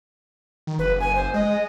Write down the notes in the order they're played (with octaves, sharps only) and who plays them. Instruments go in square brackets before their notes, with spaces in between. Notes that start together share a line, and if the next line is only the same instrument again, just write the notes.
[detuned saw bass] D#3
[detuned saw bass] F#1 [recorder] B4
[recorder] G#5
C5
[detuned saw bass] G#3 [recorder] D#5